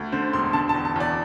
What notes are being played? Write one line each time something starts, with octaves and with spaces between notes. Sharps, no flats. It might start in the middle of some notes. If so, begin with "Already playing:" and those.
Already playing: D2
D3 C5
E1 C6
D3 A5
A5
E2
A5
E2 D5